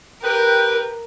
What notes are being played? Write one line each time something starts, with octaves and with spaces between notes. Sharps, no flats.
G4 A#4 B4 G5